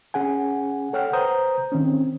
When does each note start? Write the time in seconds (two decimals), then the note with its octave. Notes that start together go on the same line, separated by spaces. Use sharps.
0.14 C#4 G#4 F#5 G#5
0.93 A4 C#5 F#5 G5 F6
1.13 B4 C5 A#5 D#6 G6
1.72 D#3 C4 C#4